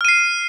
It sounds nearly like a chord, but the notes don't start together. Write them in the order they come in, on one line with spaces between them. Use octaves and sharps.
F6 D#7 C7